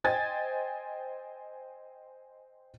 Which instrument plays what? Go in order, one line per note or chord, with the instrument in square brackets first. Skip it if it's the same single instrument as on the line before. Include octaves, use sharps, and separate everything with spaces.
[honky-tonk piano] C5 D#5 G5 G#5 G#6 A6